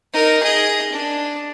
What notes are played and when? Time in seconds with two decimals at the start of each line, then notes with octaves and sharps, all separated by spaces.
0.14 D#4 A#4
0.43 G#4 D#5
0.92 D4